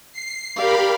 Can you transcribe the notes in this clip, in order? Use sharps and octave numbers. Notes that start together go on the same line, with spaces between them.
C7
G4 A#4 D5 F5 B5